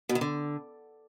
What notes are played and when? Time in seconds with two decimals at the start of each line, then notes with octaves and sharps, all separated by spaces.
0.09 B2
0.15 D#3
0.21 D3